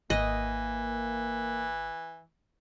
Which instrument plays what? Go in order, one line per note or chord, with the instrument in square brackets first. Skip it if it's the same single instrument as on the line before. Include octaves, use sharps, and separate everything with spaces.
[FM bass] G#1 [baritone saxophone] E3 [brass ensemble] A#3 [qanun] D#5